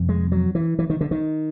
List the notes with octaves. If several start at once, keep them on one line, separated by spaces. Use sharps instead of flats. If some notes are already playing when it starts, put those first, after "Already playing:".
Already playing: F2 C3
G#3
F#3
E3
E3
D#3
D3
D#3